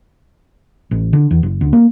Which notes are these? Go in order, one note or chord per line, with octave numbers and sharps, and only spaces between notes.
A1
D3
E2
F#1
D2
A#3